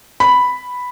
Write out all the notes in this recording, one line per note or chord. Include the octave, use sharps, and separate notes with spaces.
B5